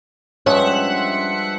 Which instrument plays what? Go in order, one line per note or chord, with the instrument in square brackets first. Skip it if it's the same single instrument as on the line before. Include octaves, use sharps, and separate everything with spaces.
[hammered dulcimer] G2 F3 G#3 [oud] C#4 [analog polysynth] E5 F#5 F#6